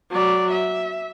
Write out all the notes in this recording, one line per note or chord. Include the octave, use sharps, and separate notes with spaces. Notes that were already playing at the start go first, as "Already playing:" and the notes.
F#3 D5
E5